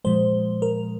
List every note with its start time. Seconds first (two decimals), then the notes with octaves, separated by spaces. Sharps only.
0.04 A#2 F3 G#3 C5
0.62 A#4